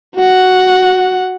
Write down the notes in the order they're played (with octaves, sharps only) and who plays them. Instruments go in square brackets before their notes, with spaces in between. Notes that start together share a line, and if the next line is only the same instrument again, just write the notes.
[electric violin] F#4 F#5